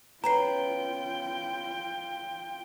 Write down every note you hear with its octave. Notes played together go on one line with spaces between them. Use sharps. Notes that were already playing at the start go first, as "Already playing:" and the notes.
B3 C#4 F4 B4 G5 A#5 C7